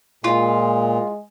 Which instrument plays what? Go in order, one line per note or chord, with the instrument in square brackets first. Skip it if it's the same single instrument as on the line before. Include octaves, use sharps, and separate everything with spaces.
[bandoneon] A#2 [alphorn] G#3 [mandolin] F4